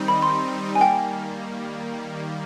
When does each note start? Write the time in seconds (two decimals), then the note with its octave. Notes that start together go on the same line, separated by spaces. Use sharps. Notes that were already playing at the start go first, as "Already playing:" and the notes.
Already playing: D#3 G3 C4 D#4
0.08 B5
0.22 C6
0.75 G#5
0.81 D#3 G3 A#3 G5